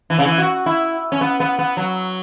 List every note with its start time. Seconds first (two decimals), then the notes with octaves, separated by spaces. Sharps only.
0.10 E3
0.18 C#3
0.26 E3
0.38 F#4
0.66 E4
1.12 C#4
1.21 B3
1.40 B3
1.59 B3
1.77 F#3